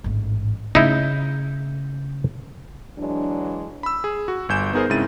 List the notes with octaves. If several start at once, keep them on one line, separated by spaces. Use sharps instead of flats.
A1 G#2
C#3 A3 D#4 E4 G6
E3 F#3 G#3 D4
B5 E6
G#4
F#4
G1 G#5 G6 E7
B3 D#4 G#4 A#4 C5
G#2 C#3 C4 E4 A6 D#7